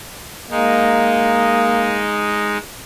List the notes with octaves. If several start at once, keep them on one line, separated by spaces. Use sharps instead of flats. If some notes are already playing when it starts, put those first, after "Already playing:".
G#3 A#3 D#4